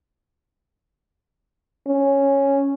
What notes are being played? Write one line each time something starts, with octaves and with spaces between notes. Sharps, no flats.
C#4